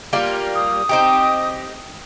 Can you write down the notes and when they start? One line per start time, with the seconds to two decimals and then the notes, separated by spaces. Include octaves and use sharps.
0.13 G3 A#3 F4
0.55 D#6
0.89 C4 D#4 G4